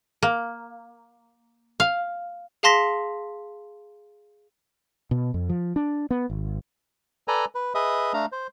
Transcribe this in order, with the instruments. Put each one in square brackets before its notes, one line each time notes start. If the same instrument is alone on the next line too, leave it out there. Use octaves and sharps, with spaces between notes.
[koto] A#3
F5
[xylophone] G#4 F5 A5 C6 A#6 B6
[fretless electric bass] B2
F2
F3
D4
B3
G#1
[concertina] A4 B4 D5 G#5 A#5
B4
G#4 B4 D#5 E5 D#6
A3 D4 F5 A#5
C5